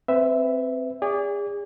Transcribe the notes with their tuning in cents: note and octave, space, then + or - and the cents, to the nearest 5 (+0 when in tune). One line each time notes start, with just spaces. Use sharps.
C4 +0 B4 +25 E5 +0
G#4 -35 D5 -30